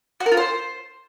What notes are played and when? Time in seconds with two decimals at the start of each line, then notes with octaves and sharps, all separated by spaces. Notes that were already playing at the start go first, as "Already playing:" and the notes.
0.20 F#4
0.26 A#4
0.32 F4
0.37 C5